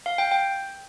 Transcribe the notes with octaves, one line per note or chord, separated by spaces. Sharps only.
F5
G5
G5